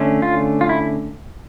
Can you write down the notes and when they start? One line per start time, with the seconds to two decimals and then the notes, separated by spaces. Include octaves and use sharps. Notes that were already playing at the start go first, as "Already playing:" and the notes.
Already playing: D3 A3 C#4
0.22 F4
0.61 F4
0.69 E4